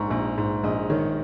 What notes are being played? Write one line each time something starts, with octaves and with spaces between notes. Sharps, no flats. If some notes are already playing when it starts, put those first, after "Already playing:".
Already playing: A#1 G#2 A#5 C#6
A#1
G#2
A#1 D#5
D#3 C#5